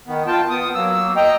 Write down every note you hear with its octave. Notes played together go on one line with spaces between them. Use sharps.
D#3 B3
F4 G5 A5
B3 D#6
F#3 A#3 E6
D#5 G5 A#5